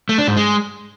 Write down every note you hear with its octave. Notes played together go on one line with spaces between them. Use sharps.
A3
D4
G#2
G#3